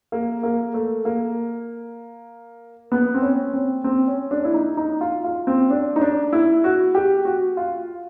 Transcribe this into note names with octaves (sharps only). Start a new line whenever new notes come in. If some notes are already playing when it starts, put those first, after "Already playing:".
A#3
A#3
A3
A#3
B3
C4
C#4
C4
C4
C#4
D4
E4
D#4
D#4
F4
F4
C4
D4
D#4
D4
E4
F#4
G4
F#4
F4